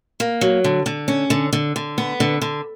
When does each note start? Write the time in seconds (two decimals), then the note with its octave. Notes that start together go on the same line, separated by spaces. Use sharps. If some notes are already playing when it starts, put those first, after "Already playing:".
0.20 A#3
0.41 F#3
0.64 D3
0.86 D3
1.08 C#4
1.30 D3
1.53 D3
1.76 D3
1.98 B3
2.20 D3
2.42 D3